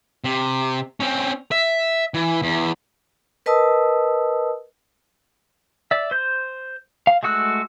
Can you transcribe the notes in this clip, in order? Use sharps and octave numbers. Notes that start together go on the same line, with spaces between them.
C3
C4 C#4
E5
E3
E2
A#4 B4 D#5 A5 D#6 E6
D5 E5
C5 G6
F5
G#3 A3 F#4 E6 F#6